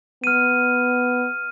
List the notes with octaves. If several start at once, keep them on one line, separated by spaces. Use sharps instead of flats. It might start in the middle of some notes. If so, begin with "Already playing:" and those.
B3 F6 D#7